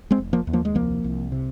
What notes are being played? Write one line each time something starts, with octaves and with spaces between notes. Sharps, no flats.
G#3 C4
F1
F3 A#3
D#2
F3 A#3
G#3
C2 F3 A#3
C2
C3